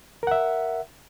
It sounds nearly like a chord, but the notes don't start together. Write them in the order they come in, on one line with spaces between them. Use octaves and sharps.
A#4 F#5 E5